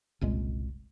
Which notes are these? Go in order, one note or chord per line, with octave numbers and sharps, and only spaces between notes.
F#1 C2 A#2 G#3